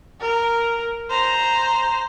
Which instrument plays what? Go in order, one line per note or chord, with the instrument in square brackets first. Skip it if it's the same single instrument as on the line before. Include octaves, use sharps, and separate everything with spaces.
[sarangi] A#4
[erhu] C5 [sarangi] A#5